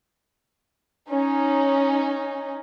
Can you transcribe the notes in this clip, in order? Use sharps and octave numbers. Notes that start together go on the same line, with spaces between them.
C#4 D#4